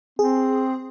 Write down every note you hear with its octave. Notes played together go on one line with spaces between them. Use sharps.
C4 G#4